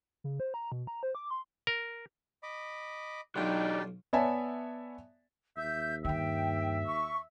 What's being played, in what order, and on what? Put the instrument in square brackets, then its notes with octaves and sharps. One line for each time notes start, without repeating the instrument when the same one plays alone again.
[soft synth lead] C#3
C5
A#5
B2
A#5
C5
D6
C6
[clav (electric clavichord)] A#4
[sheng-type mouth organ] D#5 B5 D6
[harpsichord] B1 F4 [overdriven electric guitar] F#3 G4 [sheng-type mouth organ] D4 D5 G5 [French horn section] D#4
[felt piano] B3 C#5 D5 E5 G#5 A5
[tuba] D#2 [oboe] E5 [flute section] G6
[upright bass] G2 D#3 [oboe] E5 [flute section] G5
[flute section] C#6